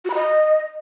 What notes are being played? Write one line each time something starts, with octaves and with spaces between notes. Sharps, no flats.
F#4
B5
D#5